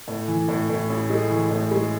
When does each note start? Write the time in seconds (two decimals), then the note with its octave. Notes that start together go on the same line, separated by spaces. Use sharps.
0.08 A2
0.28 E3
0.48 A2
0.69 A2
0.90 A1
1.10 G#3
1.30 E3
1.51 A2
1.71 G#3